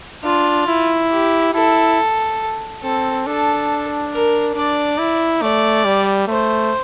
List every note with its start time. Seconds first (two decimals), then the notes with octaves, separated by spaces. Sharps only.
0.24 D4 F4
0.67 E4
1.11 G4
1.54 E4 A4
2.82 C4 A4
3.26 D4 A4
4.12 A#4
4.55 D4 D5
4.99 E4
5.42 A3 D5
5.85 G3
6.28 A3 C5